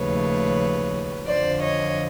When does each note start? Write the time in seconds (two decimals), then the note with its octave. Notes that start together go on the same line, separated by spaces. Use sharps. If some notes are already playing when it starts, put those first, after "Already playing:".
Already playing: D#2 C#3 F3 A3 B4 C#5
1.26 F2 D3 F3 C5 D5
1.61 C#5 D#5